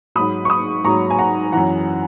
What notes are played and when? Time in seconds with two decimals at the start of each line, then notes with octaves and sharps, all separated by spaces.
0.15 G#2 F#3 B5 D#6
0.45 C#6
0.50 B5 D#6
0.84 G#2 F#3 A#5 C#6
1.10 G#5
1.19 F#5 A#5
1.52 F#2 E3 F#5 A#5